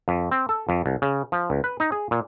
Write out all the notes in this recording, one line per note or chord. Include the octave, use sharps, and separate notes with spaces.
F2
C4
A4
F2
C2
C#3
F3
C#2
B4
D#4
G#4
A#2